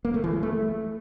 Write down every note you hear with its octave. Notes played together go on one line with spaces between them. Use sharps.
A#3
A3
E3
G#3
A3